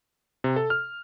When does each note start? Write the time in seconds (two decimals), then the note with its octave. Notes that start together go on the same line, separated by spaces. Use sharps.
0.44 C3
0.56 A4
0.70 F6